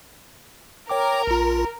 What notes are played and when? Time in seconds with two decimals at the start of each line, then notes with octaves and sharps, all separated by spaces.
0.89 A#4 C#5 G5 D6
1.27 A#1 F4